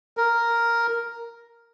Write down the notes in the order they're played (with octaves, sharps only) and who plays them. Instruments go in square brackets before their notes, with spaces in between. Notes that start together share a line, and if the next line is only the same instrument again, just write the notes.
[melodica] A#4